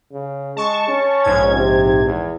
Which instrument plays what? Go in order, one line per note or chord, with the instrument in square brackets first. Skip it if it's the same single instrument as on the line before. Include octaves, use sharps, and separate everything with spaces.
[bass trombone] C#3
[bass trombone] G#3 [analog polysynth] A5 C#6
[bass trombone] C#4
[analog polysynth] A#1 G#2 G#6
[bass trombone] C3
E2